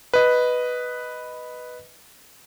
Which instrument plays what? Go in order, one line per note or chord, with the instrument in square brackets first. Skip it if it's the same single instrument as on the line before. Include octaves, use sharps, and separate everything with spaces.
[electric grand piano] B4 D#5